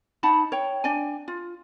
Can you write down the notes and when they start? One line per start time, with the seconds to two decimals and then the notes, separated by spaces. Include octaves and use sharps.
0.23 D#4 F#5 A5 B5
0.52 C#5 G5
0.84 D4 D5 G5 G#5
1.28 F4